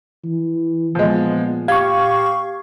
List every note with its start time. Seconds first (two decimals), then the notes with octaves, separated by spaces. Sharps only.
0.24 E3
0.95 A#2 F3 G#3 B3
1.68 G4 F5 C#6 G#6